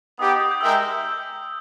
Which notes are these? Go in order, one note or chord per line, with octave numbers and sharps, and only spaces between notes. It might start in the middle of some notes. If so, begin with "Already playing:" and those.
B3 D#4 G4 D#6
D#6
G6
G#3 D#4 A#4 E5 G5 E6